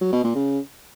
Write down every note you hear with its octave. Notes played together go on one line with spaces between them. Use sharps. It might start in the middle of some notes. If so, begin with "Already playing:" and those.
F#3
B2
A#2
C#3